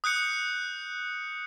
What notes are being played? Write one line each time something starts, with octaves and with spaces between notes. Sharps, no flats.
D#6 F#6 G6 C#7